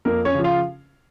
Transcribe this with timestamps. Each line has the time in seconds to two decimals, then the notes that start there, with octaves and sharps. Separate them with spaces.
0.05 F2 A#3 A#4
0.25 C#4 C#5
0.35 C#3 F3
0.44 F4 F5